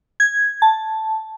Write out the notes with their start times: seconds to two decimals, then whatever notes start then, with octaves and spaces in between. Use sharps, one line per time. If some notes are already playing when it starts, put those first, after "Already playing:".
0.20 G#6
0.62 A5